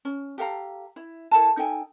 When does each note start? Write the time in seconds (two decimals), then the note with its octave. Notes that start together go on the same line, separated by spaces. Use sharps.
0.05 C#4
0.38 G4 A4 F5 A#5
0.96 E4
1.31 E4 A4 A#4 A5
1.57 D#4 A4 G5 G#5